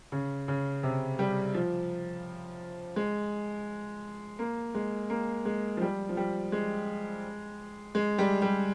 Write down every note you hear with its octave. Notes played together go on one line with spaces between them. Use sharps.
C#3
C#3
C3
G3
F3
G#3
A#3
G#3
A#3
G#3
F3
G3
F3
G3
G#3
G#3
G3
G3